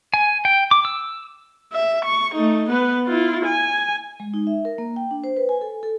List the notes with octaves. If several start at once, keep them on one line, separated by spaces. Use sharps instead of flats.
G#5
G5
D6
E6
E5
C#6
A3 D#4
B3 B4
E4 F4
G#5
G#3
D#4
E5
A#4
A#3
G5
D4
C5
B4
G#5
A4
A4